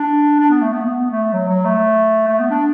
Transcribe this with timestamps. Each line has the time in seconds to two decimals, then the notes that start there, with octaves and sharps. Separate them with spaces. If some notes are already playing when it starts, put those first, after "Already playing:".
Already playing: D4
0.39 D4
0.50 B3
0.61 A3
0.73 B3
0.81 A3
0.86 B3
1.11 A3
1.33 F#3
1.49 F#3
1.65 A3
2.28 A3
2.39 B3
2.50 D4